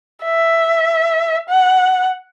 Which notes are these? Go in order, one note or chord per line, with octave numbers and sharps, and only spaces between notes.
E5
F#5